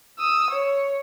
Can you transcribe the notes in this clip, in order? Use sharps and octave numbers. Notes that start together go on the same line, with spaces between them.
D#6 E6
C#5